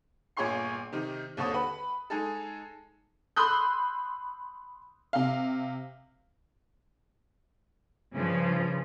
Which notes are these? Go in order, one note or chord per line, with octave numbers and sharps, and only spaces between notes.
G1 A#2 G#4 C#5 C6 C7
C3 D#3 D#4 G4
D#2 D3 C4 A4 C#5 D#6
B4 F#5 B5
G#3 D#4 G#4 A4
B5 C6 D#6 E6 F#6 G6
C3 F5
G2 C#3 F3